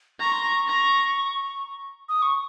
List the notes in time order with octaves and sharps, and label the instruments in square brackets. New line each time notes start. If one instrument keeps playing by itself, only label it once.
[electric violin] A#5 [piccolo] C#6
[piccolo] C6
C#6
[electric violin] A#5
[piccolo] D#6
C#6